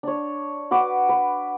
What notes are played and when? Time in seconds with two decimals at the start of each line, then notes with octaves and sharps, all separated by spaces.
0.03 D4 C#5
0.71 F#4 B4 D6
1.09 B4